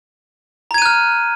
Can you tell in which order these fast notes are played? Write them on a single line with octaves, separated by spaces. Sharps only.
A#5 G#6 D#7 F#6 F6